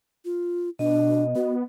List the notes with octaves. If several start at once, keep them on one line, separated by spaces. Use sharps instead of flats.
F4
B2 D4 D#5
B3 F#4